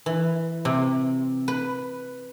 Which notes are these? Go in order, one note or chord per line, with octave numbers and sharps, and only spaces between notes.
E3
C3
B4